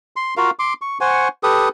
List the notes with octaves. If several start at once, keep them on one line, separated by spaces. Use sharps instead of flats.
C6
F4 F#4 A#4 F5
C6 D6
C#6
C5 F#5 G#5 C#6
G4 A4 B4 D#6